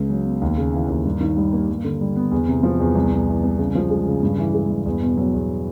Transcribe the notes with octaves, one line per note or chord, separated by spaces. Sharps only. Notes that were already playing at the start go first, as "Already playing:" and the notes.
Already playing: C#2 C#3
F#3
B3
D#2
C#3
E3
D#2
G2
D#3
G3
A#3
G2
D3
G3
B3
E2
C3
F3
E2
C2
C3
E3
C2
C#3
F3
G#3
C#3
G2
E3
G#3
G2
E2
B2
F#3
E2